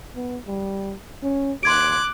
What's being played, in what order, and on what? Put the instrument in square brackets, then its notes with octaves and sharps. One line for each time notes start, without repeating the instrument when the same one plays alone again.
[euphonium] B3
G3
C#4
[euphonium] D#2 [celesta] C6 G#6 D7 [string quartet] D6 F#6